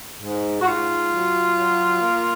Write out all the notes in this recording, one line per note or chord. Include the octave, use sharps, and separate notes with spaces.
G#2
F#4
G#2 F4
F#3
F#3
A#3